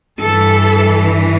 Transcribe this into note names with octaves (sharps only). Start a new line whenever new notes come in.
G2 E3 A4